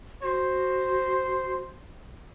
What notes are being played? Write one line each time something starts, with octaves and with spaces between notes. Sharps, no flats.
F#4 C5